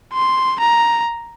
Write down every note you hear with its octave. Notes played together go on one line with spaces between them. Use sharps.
C6
A#5